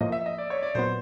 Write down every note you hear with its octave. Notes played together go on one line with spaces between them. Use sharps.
A2 F3 A#3 D#5
E5
D#5
D5
C#5
D5
A#2 F#3 B3 C5